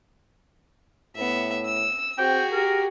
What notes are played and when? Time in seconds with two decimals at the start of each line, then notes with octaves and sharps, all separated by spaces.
1.16 A2 B3 E5
1.65 E6
2.18 C4 F#4 G#4 G5
2.52 G4 A#4